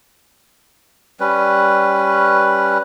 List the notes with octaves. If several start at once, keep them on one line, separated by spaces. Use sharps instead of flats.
G3 C#4 B4